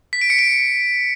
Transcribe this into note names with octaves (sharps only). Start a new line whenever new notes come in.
B6
D7
C#7
D7